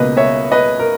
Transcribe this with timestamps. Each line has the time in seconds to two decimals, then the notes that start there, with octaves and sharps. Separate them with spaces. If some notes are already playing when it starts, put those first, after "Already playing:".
Already playing: C#2 B2 A#3 B4 D#5
0.17 C#5 E5
0.52 B4 D#5
0.79 A#4